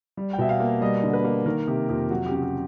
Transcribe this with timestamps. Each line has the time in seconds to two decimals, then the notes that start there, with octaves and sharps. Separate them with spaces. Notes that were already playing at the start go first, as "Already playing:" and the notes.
0.17 G3
0.33 G5
0.39 B2 E5
0.49 F5
0.60 A#3
0.81 G3 D#5
1.03 D3
1.13 B4
1.24 A#3
1.46 D#3 A#4
1.67 C3 G4
1.89 F2 G4
2.10 F#3 F#4
2.26 G4
2.31 C#3 F#4
2.43 G4